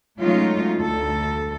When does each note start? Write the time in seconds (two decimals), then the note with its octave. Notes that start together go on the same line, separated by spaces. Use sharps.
0.20 F#3 G#3 A3 C#4 D#4 F4
0.77 D2 A4